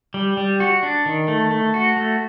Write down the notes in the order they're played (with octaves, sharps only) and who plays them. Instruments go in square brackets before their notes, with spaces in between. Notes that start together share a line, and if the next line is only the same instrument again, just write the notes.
[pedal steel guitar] G3
G3
F#4
D4
D#3
A3
A3
F#4
A3